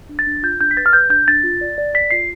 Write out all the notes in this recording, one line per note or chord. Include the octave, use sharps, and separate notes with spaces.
D4
A6
D4
F4 G6
D4 G6
B6
B4 A6
F6
B4 G6
D4 G6
D4 A6
F4
D5
D5
D5 B6
F4 C7